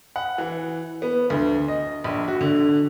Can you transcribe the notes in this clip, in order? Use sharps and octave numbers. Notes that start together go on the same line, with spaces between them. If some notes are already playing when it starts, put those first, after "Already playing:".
F#5
E3
B3
D2
D#5
A#1
F#4
D3